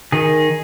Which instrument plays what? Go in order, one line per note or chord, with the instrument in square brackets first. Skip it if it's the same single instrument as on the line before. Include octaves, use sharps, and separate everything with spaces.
[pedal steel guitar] D#3 G#4